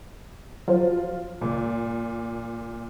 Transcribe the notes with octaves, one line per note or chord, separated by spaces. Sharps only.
F3 F#3 F4
C#2 A#2